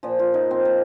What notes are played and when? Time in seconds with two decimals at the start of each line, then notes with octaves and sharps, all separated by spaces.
0.03 A#2 F3
0.19 F4
0.34 D#4
0.51 C4
0.65 A#3